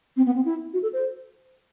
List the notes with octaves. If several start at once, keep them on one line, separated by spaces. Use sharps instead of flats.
C4
B3
C4
E4
F#4
A4
C5